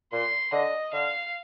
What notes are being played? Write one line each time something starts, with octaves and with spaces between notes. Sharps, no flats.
A#2 C6
D3 D#5
D3 F5